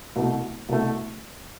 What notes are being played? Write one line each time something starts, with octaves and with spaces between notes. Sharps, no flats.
C2 B2 A3
C2 B2 A3